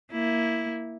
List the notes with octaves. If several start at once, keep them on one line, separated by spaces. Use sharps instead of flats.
A#3 E4